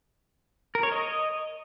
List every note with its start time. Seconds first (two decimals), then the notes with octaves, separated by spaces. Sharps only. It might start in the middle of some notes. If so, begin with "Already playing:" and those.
0.75 A#4
0.83 C#5
0.92 D#5